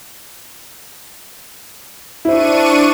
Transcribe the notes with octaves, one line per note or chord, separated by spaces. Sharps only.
D4 E4 C5 C#6 D#7